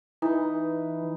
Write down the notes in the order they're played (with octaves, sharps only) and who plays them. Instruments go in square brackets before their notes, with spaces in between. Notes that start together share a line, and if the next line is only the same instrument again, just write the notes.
[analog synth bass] E3 [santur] D#4 B4